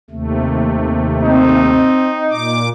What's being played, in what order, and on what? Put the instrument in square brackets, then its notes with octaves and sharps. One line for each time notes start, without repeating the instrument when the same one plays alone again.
[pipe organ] D#2 C3 A3
[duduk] C4 [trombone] D#4
[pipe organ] A#2 D6